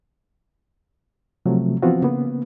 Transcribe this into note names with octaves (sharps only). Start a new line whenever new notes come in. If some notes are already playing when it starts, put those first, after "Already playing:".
C3 F3 F#3 A3
E3 F3 B3 C4 F4 F#4
C#3 A#3 B3